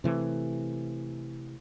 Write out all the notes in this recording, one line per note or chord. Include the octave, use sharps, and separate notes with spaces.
C3 E3 A3